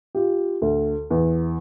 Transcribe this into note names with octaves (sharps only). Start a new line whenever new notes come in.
F4 G4
D2
E2